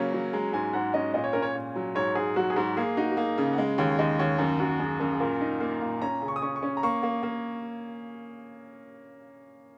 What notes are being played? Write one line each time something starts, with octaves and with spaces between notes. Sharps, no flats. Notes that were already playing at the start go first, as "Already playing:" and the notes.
Already playing: C#3 F#3 A#3 C#4
F#3
G#3 A#5
G#2 G#5
G#2 F#5
C#4 D#5
A#2 D#5
C#5
C#4 A#4
C#5
A#2
F#3
G#2 C#5
G#2 G#4
F#3 F#4
G#4
G#2 F#4
A#3 G#4
D#4 F#4
F#4
A#3 G#4
C#3
F#5
G#3 D#5
D#2 C#5
D#2 D#5
D#2 C#5
F#2 A#4
F#2 F#4
F#2 G#4
F#2 A#4
G#4
A#2 A#4
D#4
A#3
A#2
C#4 A#5
C#3
C#6
D#6
C#4 C#6
C#6
C#4
A#5
A#3 C#6
A#3
A#3